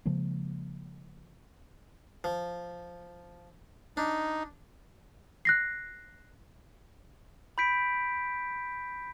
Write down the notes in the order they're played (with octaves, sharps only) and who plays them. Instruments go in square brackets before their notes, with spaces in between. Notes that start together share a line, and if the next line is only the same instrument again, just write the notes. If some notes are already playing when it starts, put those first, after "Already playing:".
[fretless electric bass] C#3 F3 G#3 A#3
[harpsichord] F3
[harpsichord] D4 [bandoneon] D#4
[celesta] F#6 A#6 C7
[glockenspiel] B5 G6 B6 D7